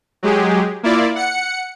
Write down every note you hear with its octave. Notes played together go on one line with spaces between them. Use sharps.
F#3 G#3 G4 G#4
A#3 E4 F4 D5
F#5 C#7